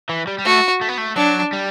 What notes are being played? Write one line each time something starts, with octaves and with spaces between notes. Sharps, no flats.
E3
G3
G3
A3 F#4
A3
B3
A3
F#3 D4
G3